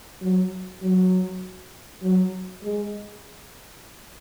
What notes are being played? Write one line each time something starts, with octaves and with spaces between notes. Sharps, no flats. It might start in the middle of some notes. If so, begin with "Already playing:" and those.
F#3
F#3
F#3
G#3